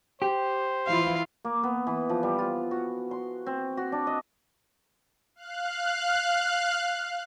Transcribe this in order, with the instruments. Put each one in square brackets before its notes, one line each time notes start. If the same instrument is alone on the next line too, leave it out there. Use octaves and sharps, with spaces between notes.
[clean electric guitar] G4 [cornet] C5
[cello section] E3 E4 F4 [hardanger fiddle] F5
[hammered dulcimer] A#3
B3
E3
F3
G3
F4
F#4
C6
C4
F#4
D4
D#5
[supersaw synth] F5 F#6